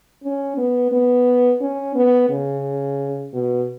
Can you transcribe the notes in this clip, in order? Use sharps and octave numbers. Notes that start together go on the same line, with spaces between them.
C#4
B3
B3
C#4
B3
C#3
B2